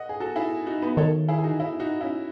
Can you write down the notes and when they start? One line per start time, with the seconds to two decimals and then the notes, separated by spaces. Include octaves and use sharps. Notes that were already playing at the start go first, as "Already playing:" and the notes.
Already playing: D#5 F#5
0.09 G#4
0.20 F#4 A4
0.36 E4 G#4
0.66 D#4 F#4
0.82 B3 D#4
0.97 D#3 A4 C#5
1.28 E4 G#4
1.38 G#4
1.44 D#4 F#4
1.59 E4 G#4
1.80 D#4 F#4
2.01 C#4 E4